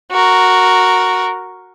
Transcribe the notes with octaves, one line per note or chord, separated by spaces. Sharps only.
F#4 A#4